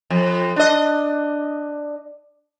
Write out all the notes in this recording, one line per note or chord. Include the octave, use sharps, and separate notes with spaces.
F2
D4 D#5